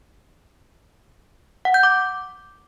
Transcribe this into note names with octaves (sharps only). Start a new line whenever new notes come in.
F#5
G6
D6